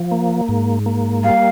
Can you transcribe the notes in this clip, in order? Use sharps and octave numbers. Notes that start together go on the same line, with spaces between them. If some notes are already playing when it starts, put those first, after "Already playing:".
Already playing: F3
A#3
G#2
A#3
G3 F5